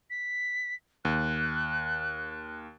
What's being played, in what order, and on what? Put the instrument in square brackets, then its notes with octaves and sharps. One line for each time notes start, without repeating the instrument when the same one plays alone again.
[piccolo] B6
[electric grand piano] D#2 [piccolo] F#6